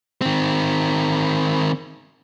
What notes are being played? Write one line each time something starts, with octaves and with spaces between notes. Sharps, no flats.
D#3 C4